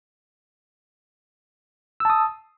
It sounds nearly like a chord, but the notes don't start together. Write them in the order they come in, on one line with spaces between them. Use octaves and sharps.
E6 A5 D#6